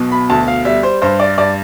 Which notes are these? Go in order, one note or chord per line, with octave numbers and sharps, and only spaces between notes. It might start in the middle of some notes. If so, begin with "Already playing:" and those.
Already playing: B1 B2
B5
D2 A5
F5
G3 E5
C5
G2 C5
D5
G2 D5